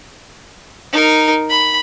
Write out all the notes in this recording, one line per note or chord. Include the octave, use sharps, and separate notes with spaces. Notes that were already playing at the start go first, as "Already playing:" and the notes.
D#4 A#4
B5